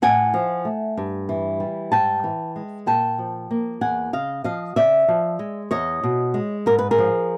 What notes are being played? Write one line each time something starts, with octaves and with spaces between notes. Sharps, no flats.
A2 F#5 G#5
F3
A3
G2
E3
G3
G#2 G5 A5
E3
G#3
A#2 G5 A5
F3
A#3
E2 F#5 G#5
C#3 D#5 F5
F3 D#5 F5
C#3 D5 E5
F3
G#3
E2 C#5 D#5
B2
G#3
G#2 A#4
B4
G#4 A#4
F3